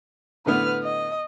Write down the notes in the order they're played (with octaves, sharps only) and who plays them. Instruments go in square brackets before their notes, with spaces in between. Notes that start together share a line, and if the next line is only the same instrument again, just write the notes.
[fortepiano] A2 D3 B3 [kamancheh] B4 F6
[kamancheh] D#5